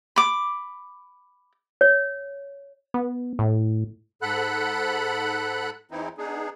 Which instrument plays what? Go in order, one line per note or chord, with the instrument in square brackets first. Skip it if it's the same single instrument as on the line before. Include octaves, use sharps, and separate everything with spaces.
[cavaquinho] B5 D6
[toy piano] C#5
[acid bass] B3
A2
[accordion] G#2 A4 F#5 B5 F#6
E2 E3 C4 D#4 E4
B3 D4 D#4 G#4